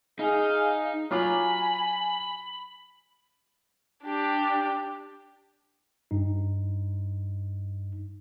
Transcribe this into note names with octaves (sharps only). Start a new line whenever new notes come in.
D#4 G#4 F5
F#3 F4 G#5 B5 D6
D4 G4
G2 D#4